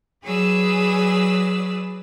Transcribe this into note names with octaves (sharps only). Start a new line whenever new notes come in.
F#3 G#4 B4 D5 E6